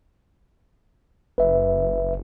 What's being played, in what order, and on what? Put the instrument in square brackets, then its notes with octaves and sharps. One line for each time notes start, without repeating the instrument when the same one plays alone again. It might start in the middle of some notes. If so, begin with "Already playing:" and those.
[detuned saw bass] F#1 [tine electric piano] B4 E5